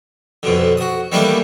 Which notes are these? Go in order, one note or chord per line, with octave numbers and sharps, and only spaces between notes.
F2 B2 D3
F#4 D#6
D#3 E3 G3 A3 A#3 D4